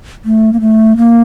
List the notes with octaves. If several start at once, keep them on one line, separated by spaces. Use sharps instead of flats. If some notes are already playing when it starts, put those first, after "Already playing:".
A3
A#3
A3
A#3